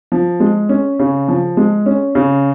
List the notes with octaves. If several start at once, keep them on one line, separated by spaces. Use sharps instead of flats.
F3
G#3
C#4
C#3
F3
G#3
C#4
C#3